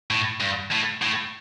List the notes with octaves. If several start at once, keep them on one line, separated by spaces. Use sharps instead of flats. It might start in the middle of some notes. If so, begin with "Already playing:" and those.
A2
G2
A2
A2